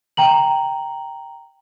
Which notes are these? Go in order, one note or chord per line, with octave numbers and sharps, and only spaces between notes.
G5 A#5 F#7